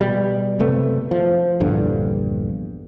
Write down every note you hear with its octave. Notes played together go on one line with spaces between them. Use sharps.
B2 G3
F#1 C3 A3 B3
F3
A#1 E2 G2 D3